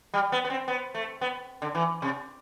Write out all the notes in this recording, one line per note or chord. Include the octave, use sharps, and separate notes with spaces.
G3
B3
B3
C4
B3
A3
B3
D3
E3
C3